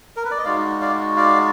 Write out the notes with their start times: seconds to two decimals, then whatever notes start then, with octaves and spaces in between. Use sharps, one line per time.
0.16 A#4
0.25 B4
0.31 D5
0.38 D#5
0.45 G#3 D#4 F#4 D5 F5
0.81 D5 F5
1.17 D5 F5